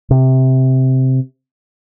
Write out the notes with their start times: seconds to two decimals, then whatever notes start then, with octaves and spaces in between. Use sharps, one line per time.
0.11 C3